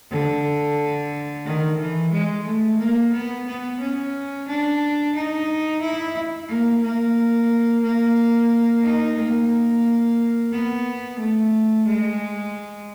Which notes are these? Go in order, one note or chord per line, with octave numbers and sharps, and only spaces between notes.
D3
D#3
E3
G#3
A3
A#3
B3
B3
C#4
D4
D#4
E4
A#3
A#3
A#3
D#4
A#3
B3
A3
G#3